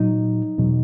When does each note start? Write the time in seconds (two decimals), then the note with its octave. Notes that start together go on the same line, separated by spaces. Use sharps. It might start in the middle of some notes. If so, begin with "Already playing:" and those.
Already playing: A#2 F#3 D#4
0.58 E2 B2 F#3